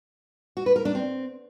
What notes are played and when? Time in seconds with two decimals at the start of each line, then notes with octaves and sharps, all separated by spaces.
0.57 F#4
0.66 B4
0.76 A#4
0.85 D4
0.95 C4